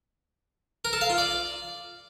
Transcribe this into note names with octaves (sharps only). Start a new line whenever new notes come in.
A#4
A4
F5
F4
D5